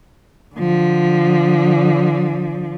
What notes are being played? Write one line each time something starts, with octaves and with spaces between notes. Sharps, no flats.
D3 F3